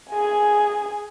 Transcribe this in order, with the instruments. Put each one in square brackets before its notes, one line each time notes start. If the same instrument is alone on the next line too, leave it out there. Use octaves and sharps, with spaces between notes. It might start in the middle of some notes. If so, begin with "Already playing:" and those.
[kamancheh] G#4 G#5